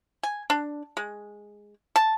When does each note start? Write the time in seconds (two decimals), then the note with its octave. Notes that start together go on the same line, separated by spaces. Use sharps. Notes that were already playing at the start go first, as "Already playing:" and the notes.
0.23 G#5
0.50 D4
0.97 G#3
1.96 A5